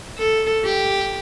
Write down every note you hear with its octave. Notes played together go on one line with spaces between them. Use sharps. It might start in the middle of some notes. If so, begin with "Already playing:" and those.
A4
G4